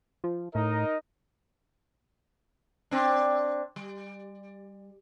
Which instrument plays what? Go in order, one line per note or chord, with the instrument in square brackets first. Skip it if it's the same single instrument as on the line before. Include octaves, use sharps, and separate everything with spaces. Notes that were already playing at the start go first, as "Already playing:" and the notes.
[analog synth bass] F3
[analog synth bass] A2 [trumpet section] D#4 A#4 D#5
[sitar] C4 D4
G3